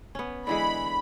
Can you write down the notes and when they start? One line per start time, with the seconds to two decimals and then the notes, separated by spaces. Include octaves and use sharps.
0.15 B3 C#4
0.47 D3 E3 G#3 B5